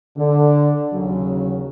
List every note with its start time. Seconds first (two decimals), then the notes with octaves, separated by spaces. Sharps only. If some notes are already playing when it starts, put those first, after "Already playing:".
0.17 D3
0.93 D#2 C#3 F#3